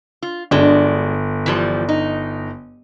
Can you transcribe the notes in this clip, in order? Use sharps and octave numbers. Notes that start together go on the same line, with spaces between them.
F4
G1 G#3 D4 F#4
E3 F3 G3
D#4